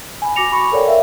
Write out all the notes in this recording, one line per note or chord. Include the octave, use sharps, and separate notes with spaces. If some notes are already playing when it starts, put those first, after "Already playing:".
G#5 B5
F#4 G#5 D6 A#6 C#7 F7
B5 C#6
A4 A#4 C#5 D5 F5 G5
A#4 E5 F5